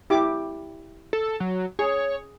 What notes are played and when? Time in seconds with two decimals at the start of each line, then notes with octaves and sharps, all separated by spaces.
0.10 E4 G4 D6
1.13 A4
1.40 F#3
1.79 G#4 C#5